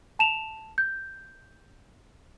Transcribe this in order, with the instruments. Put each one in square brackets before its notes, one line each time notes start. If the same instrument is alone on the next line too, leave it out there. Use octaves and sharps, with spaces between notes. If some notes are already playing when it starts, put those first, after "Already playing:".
[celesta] A5 E7 F7
G6